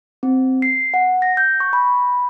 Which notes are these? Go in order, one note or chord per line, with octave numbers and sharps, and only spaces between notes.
C4
C7
F#5
A#6
G6
C#6
B5